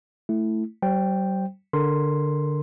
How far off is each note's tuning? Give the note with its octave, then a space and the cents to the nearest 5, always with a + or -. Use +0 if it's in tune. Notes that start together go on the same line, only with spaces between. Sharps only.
A3 +0 E4 +0
G3 -45 C5 +0 G5 +0
D3 +0 A#4 +0 C6 +0